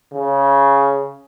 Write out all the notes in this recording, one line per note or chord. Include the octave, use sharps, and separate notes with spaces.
C#3